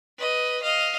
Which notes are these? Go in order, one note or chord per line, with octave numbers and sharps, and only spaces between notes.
B4 D#5
D#5 F5